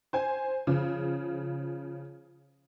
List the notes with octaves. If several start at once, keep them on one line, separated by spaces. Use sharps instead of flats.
C5 G#5
C#3 F3